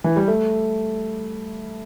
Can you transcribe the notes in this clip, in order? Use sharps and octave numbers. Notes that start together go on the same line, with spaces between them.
E3
G3
A3